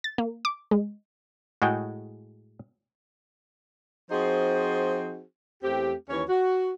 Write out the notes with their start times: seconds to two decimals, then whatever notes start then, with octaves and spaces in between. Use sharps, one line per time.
0.04 A6
0.18 A#3
0.45 D6
0.71 G#3
1.62 A2 G#3 F#4 G#4 G5
4.11 F3 C4 D#4 F#4 G#4 C5
5.63 E2 A3 C4 G4
6.10 D#2 E3 C#4 C#5
6.29 F#4